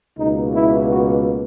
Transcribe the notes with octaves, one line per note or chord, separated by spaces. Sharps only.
C#2 B2 A#3 D#4
E4
F#4